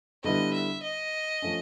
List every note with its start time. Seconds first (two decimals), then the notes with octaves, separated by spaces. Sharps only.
0.24 D3 G3 B3 E4 D#5
0.54 E5
0.83 D#5
1.42 F3 A3 C#4